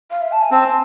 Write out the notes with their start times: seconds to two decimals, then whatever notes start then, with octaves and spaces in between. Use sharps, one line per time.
0.11 F5
0.21 E5
0.32 A5
0.41 G#5
0.51 C4 A5